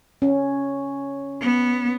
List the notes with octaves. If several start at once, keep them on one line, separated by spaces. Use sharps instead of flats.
C#4
B3